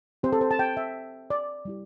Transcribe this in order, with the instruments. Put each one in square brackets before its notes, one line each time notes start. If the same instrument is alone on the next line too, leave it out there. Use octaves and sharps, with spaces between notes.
[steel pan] C4 G4 C5
A4
C5
A5
G5
E5
D5
G3 E4 G4